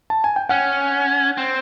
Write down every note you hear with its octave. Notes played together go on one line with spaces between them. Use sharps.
A5
G#5
G5
C#4 F#5
C4